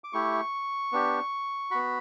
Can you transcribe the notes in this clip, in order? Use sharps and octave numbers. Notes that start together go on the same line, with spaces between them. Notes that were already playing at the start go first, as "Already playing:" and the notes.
D6
A3 E4 G4 C#6
B3 D4 G4
B3 F#4 B5